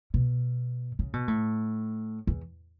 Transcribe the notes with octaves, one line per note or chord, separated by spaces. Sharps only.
B2
C#3
B2
A2
E2